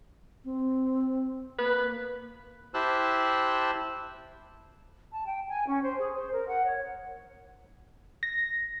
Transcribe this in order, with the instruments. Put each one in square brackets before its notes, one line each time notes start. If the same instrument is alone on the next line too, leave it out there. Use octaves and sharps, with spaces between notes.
[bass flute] C4
[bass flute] A#3 [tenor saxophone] B4
[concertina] E4 G4 C5 A5 E6 F#6
[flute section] A5
G5
G#5
C#4
C5
G#4
C5
A#4
F#5
C#5
[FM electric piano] A#6